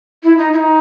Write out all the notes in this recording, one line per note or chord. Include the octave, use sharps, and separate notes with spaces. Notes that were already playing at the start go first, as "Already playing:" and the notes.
E4
D#4
E4
D#4